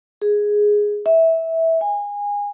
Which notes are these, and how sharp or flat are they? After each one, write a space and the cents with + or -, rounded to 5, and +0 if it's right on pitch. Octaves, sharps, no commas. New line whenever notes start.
G#4 +0
E5 -15
G#5 -25